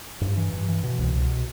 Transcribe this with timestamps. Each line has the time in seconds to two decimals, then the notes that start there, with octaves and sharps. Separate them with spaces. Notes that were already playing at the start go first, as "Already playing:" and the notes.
0.21 G2
0.37 E3
0.53 G2
0.68 E3
0.83 B2
0.99 C2
1.15 B2